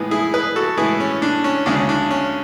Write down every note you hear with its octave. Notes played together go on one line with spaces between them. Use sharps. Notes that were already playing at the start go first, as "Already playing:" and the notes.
Already playing: A2 E3 G#3 B3
E4 G#4
G#4 B4
F#4 A4
A2 E3 G#3 B3 E4 G#4
C#4
D4
C#4
D2 C#3 G#3 C#4 D4
D4
C#4